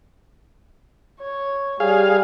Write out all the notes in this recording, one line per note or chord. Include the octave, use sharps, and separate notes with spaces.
C#5
G3 G#4 F5